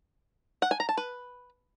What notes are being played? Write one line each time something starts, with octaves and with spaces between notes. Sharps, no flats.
F#5
G#5
A#5
A5
B4